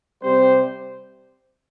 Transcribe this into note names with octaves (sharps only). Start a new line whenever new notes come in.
C3 G3 C4 G4 C5